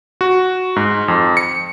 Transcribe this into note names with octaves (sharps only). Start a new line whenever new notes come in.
F#4
G#2
F2
C#7